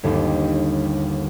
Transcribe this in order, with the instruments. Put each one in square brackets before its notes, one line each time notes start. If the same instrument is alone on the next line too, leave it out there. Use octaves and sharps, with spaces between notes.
[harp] G1 D#2 G4